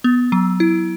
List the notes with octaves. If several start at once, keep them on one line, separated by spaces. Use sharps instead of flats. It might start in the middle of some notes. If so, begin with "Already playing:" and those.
B3
F#3
E4